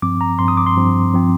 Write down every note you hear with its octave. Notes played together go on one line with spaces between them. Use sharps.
G2 F3 C4 D6
A#5
G2 F3 C4 C6
D#6
D6
C6
G2 F3 C4
F3 C4